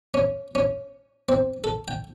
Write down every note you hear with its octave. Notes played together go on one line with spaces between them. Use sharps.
C#4
C#4
C4
A4
G5